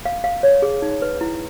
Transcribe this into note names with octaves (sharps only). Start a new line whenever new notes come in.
F5
F5
C#5
G#4
D#4
B4
E4